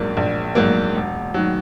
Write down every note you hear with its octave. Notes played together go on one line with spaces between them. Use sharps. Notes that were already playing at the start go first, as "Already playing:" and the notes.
Already playing: A#1 G#2 F#3 A#3
A#1
G#2 F#3 A#3
E1
D#3 F#3